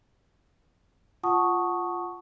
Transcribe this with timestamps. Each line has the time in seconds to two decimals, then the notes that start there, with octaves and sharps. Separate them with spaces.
1.23 F4 F#5 A5 C#6 D#6